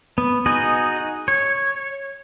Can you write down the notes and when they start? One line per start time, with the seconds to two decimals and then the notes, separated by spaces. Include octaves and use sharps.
0.18 B3
0.46 D#4 F#4 G#4 D#5
1.28 C#5